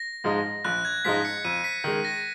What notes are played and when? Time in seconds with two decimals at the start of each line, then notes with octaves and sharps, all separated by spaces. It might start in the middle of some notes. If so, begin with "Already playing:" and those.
Already playing: A#6
0.24 G#2 F3 G#3 D#4
0.65 A#1 F#6
0.85 G#6
1.05 G#2 F3 G#3 D#4 B6
1.25 C#7
1.45 F2 D#7
1.64 B6
1.84 D#3 G#3
2.05 A#6